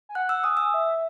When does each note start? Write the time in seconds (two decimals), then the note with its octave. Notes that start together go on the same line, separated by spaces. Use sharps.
0.09 G#5
0.15 F#5 F#6
0.29 E6
0.44 G#5 D#6
0.57 E6
0.74 E5